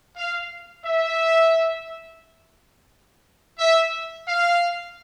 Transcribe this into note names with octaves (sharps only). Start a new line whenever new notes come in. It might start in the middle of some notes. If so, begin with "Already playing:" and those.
F5
E5
E5
F5